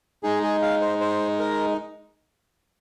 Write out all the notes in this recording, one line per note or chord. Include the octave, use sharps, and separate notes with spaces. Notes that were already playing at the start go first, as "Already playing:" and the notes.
G#3 D#4 G#4
G#4
F5
C5
C5
A#4